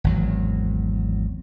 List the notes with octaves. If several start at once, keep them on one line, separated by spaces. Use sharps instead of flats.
G#1 E2 F#3